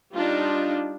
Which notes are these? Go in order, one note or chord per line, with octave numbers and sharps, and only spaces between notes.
G3 D4 D#4 F4